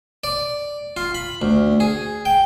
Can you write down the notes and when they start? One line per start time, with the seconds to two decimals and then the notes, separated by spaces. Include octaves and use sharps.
0.24 D5
0.97 F4
1.15 B5
1.42 D2
1.80 G#4
2.25 G5